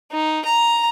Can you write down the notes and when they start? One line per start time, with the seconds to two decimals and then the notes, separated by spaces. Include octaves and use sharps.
0.12 D#4
0.45 A#5